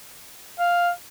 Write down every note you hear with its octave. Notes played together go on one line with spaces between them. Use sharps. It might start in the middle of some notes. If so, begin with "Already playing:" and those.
F5